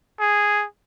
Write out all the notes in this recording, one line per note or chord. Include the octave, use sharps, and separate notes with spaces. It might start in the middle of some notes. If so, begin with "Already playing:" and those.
G#4